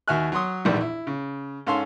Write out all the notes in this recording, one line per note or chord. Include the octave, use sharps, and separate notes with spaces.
D#2 F#4 E5 G#5 F6 F#6
F#3 C#5 C6 D#6
A#1 E2 G#2 E3 G3
E4
C#3
G#2 C#4 A4 F5 G#5 C6